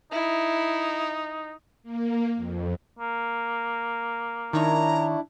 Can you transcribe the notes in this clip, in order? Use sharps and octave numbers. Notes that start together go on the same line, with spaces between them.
D#4 E4
A#3
F2
A#3
D#3 D4 E4 C#5 A#5